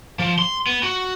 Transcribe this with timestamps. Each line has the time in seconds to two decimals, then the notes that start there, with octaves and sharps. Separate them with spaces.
0.19 F3
0.39 C6
0.66 B3
0.83 F#4